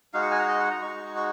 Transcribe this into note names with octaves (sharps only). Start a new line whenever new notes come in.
G#3 D#4 F#4 F5
F#5
G#5
A#5
D#5
F#5
A#5
G#3 D#4 F#4 C#6
C#6